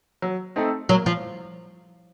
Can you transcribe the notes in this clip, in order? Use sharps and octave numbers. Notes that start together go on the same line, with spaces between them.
F#3
A3 C4 D#4 A4
F#3 A#3
F3